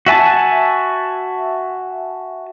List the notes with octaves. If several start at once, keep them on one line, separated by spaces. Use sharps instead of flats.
F#4 E5 G#5 A5